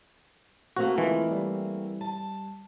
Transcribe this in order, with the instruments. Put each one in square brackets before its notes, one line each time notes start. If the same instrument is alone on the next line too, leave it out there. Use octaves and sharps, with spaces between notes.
[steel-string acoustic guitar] A3 A#3 C4 [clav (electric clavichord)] F#4
[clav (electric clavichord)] E3 [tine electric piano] G#3 F4
[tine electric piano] G3
[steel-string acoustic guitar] A5